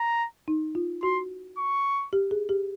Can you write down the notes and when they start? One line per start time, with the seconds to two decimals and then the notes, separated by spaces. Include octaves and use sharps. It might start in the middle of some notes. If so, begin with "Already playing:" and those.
Already playing: A#5
0.48 D#4
0.75 F4
1.03 F#4 C6
1.58 C#6
2.13 G4
2.31 G#4
2.49 G4